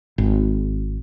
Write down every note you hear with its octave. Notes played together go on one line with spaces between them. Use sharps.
G#1